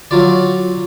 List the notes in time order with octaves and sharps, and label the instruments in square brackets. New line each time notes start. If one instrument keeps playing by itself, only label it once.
[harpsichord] F#3 F4 D5